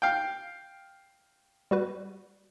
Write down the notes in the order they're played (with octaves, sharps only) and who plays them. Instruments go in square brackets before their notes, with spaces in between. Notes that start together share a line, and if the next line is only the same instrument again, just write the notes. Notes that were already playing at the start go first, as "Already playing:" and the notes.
[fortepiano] F5 G5
[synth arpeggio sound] G3 F#4 B4